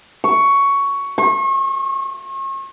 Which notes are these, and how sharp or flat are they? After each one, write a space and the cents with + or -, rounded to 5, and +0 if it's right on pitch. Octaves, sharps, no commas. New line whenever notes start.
C#6 +10
C#6 -40